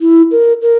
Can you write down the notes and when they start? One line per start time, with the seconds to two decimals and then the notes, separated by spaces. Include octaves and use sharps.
0.01 E4
0.31 A#4
0.62 A#4